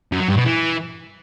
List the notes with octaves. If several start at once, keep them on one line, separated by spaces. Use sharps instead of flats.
F#2
F#3
G2
B2
E3